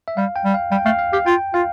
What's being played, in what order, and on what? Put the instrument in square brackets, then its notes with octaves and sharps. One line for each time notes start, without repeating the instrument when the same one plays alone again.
[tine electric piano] E5
[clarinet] G3 [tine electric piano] F5
[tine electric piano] G5
[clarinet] G3
[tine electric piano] F5
[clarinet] G3 [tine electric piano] G5
[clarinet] A3 [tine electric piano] F5
[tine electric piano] F5
[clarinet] G4 [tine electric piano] F5
[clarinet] F4 [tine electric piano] G5
[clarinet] F4 [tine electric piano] F5